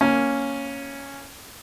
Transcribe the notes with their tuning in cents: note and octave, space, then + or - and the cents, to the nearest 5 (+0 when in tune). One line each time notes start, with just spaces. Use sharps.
A#3 +0 C#4 +0